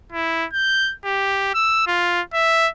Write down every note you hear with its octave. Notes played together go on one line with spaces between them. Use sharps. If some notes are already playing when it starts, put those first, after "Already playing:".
E4
G6
G4
E6
F4
E5